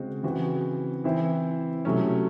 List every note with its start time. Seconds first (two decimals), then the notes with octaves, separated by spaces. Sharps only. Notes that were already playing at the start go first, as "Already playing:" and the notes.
Already playing: C#3 G#3 C4 F#4
0.23 C#3 E3 C4 F#4
1.04 E3 C4 E4
1.85 C3 F#3 A3 C#4